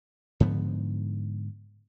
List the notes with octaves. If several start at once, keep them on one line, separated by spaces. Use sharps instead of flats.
G#2 D3 F3 B3